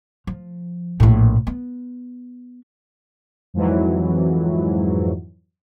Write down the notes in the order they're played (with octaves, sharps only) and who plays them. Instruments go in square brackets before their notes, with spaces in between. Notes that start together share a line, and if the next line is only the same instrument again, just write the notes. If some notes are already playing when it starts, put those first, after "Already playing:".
[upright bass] F3
A#1 A2
B3
[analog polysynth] F2 G#2 E3 F#3